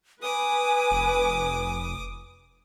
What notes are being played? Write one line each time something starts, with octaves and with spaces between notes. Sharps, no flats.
B4 G#5 D6 D#6
F1